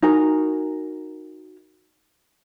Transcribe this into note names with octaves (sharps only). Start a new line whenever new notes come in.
D#4 F#4 A#4 G#5